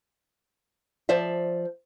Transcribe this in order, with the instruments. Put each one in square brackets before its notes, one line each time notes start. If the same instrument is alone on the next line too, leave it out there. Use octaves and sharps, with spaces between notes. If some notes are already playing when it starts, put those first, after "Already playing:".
[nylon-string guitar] F3 C5 D5 E5